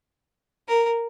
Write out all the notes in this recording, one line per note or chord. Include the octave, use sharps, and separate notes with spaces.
A#4